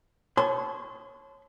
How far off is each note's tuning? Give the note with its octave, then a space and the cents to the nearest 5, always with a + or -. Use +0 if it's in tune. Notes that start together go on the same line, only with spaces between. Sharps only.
C#5 -10 A5 -20 C6 -45